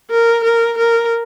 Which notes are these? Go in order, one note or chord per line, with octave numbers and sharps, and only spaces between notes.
A#4
A#4
A#4